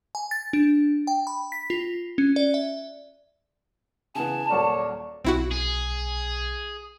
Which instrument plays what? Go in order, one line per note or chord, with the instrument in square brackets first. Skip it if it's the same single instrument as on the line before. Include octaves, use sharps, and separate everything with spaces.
[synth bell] G#5
A6
D4
G5
B5
B6
F4
C#4
D5
E5
[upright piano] C#3 E3 B3 [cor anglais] G#5 [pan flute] A5
[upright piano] D#1 F#3 A#4 [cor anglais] C#5 [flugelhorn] D5
[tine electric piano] B1 [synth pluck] C4 E4 F#4
[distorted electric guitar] G#4